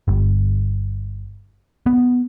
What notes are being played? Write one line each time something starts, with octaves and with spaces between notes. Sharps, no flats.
G1
B3